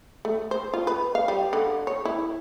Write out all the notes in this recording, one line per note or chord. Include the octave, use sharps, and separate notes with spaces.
A3
C5
F4
B4
F5
G3
D3
C#5
E4